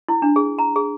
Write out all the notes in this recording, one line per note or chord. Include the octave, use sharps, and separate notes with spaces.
E4
D4
G#4
A#5
G#4